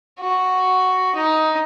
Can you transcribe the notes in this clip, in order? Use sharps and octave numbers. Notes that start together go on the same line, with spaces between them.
F#4
D#4